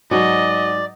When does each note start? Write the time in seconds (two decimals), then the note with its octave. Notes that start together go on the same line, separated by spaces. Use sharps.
0.11 G#2 F#3 F#4 D5 D#5